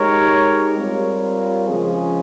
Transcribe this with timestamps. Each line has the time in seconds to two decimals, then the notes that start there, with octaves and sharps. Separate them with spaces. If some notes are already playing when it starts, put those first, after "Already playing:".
Already playing: G#3 D#4 G4 A#4 C#5
0.76 G3 C4 F4 A#4 C#5
1.67 C#3 F3 G#3 C#4 G#4